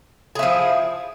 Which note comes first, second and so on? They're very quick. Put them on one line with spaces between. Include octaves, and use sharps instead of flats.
G#4 E4 F3